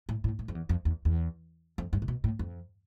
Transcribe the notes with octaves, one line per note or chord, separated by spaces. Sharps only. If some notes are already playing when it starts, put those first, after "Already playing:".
A2
A2
A2
F2
E2
F2
E2
E2
F2
G2
C3
B2
A2
F2